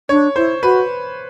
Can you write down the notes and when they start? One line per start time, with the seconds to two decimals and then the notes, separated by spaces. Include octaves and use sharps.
0.09 D4 C#5
0.36 E4 C5
0.62 F#4 B4